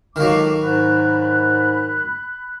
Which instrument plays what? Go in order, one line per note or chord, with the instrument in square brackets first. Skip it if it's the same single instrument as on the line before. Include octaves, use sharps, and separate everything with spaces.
[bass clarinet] C#2 [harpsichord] D#3 F#3 [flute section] A4 F5 D6
[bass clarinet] G#2 [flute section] B5 F#6